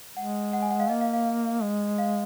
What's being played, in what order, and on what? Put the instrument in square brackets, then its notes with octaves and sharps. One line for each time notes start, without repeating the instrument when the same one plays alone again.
[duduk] G#3 [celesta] F#5
[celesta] F#5
G#5
F#5
F5
[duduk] A#3 [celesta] D#5
[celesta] F5
F5
[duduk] G#3
[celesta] F5